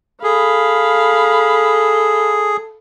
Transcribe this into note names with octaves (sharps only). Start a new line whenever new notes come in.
G#4 A4 F5 B5